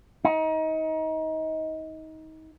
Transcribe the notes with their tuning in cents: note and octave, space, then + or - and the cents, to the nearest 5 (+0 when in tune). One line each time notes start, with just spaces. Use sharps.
D#4 +25